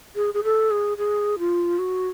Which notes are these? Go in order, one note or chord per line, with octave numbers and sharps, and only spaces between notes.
G#4
G#4
A4
G#4
G#4
F4
F#4